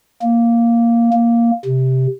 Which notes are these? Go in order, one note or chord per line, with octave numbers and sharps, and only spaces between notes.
A#3
A#3
C3